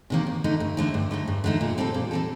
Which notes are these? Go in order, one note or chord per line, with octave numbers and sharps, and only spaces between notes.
C3 D#3 A#3
G2
D3 A3 D#4
G2
D3 A3 D#4
G2
D3 A3 D#4
G2
D3 A3 D#4
A#2
G3 C4 D#4 A4
A#2
G3 C4 D#4 A4